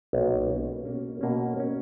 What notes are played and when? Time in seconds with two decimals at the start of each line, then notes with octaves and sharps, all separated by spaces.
0.13 B1 A#2 A#3
0.50 B2 A#3 C#4
0.85 B2 A#3 C#4
1.21 B2 A#3 C#4
1.57 B2 A#3 C#4